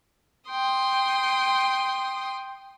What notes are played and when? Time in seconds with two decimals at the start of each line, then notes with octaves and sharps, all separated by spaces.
0.48 G5 C6 D#6